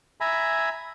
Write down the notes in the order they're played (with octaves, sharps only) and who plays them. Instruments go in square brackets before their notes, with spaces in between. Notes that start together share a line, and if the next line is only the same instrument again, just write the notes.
[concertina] E5 G#5 A#5 B5